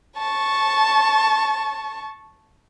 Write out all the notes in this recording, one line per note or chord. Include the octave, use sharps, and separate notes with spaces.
A5 C#6